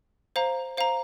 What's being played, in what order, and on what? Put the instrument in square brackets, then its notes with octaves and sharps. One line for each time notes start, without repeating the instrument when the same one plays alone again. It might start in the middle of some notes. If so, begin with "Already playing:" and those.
[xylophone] C5 F5 A#5
C5 F5 A#5